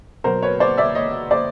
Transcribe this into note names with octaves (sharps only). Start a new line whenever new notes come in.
B2 F#3 A#4 C5
B4 C#5
C5 D5
D5 E5
C#5 D#5
C5 D5